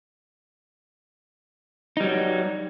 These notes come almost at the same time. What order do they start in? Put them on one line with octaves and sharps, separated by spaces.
D#4 G3 F#3